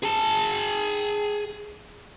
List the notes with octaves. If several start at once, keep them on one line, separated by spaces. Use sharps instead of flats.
G#4 A5